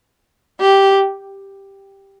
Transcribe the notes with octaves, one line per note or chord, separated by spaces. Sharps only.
G4